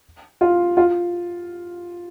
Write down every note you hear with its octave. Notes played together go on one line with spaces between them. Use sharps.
F4
F4